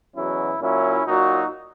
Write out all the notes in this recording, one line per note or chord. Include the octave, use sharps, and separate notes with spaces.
E2 B2 F#3 C#4 E4
A#2 F#3 C#4 E4
A#2 F#3 D#4 F#4